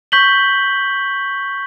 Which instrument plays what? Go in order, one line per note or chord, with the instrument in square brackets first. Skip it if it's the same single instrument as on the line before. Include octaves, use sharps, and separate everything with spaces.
[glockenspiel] C#6 G6 B6 F#7 G7